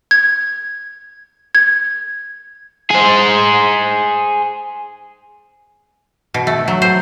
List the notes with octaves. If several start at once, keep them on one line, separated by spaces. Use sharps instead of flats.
G#6
G#6
G#4 C5
B2
A3
F#3
C5